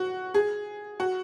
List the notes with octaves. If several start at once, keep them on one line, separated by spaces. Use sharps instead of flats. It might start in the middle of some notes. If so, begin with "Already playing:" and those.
Already playing: F#4
G#4
F#4